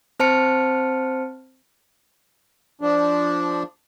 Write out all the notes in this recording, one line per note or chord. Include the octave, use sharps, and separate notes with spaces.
C4 C5 A5 F6 C#7
F3 D4